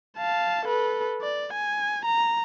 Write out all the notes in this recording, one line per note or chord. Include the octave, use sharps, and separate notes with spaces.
F5 A5
A4 B4
D5
G#5
A#5